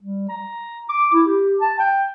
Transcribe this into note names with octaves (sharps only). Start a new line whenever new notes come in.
G3
A#5
D6
E4
G4
A5
G5